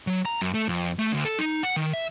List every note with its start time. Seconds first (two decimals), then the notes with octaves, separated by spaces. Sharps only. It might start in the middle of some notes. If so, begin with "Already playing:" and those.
0.07 F#3
0.25 A#5
0.42 F#2
0.54 A3
0.68 F2
0.99 A3
1.12 D2
1.25 A4
1.39 D#4
1.63 F#5
1.76 D#3
1.93 E5